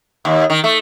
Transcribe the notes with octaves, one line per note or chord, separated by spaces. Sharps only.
D#2
D#3
A3